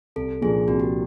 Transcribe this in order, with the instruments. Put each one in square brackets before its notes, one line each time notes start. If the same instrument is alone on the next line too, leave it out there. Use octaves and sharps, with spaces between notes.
[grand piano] C2 [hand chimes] A4
[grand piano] A#2 F3 A#3 D4 [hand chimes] G#4
[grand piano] C2 [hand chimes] F#4
[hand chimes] G4